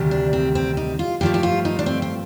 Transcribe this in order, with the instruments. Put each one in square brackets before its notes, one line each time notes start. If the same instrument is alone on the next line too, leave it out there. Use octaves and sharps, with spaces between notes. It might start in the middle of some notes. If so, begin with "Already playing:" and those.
Already playing: [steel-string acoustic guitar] D2 C3 D#3 G3
D4
C4
C4
D#4
F4
G2 F3 A3 G4
G4
F4
D#4
D4
C4
C4